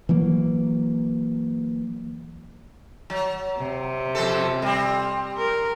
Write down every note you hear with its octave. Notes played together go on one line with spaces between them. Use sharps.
E3 F#3 A#3
F#3
C3
F2 C4 A4
G3 C4
A#4